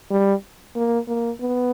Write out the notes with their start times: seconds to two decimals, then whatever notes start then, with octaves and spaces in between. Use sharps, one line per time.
0.11 G3
0.76 A#3
1.08 A#3
1.40 B3